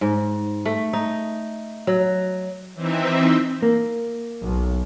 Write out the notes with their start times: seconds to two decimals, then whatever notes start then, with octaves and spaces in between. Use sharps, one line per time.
0.01 G#2
0.65 A3
0.93 D#4
1.87 F#3
2.75 E3 C4 D#4 E5
3.62 A#3
4.41 B1